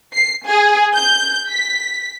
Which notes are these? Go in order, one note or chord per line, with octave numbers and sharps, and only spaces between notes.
C7
G#4
G6
B6